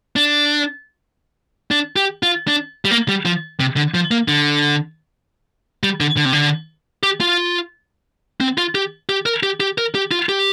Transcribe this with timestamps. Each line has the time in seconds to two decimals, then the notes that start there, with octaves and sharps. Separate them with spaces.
0.16 D4
1.71 D4
1.96 G4
2.23 F4
2.48 D4
2.85 G3
2.91 A#3
3.09 G3
3.26 F3
3.60 C3
3.77 D3
3.94 F3
4.11 A#3
4.28 D3
5.83 G3
6.00 D3
6.17 D3
6.25 C3
6.33 D3
7.03 G4
7.20 F4
8.41 C4
8.58 F4
8.75 G4
9.09 G4
9.26 A#4
9.43 G4
9.60 G4
9.78 A#4
9.95 G4
10.11 F4
10.29 G4